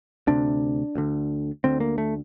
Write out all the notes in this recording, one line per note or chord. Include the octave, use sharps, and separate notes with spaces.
D2 C3 D4
D2 D3
D2 D3 C4
A#3
A3